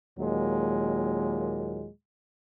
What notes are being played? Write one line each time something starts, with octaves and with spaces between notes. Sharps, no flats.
D#2 A#2 F#3 G#3